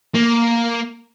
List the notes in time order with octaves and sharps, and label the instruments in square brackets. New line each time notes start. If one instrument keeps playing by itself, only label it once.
[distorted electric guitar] A#3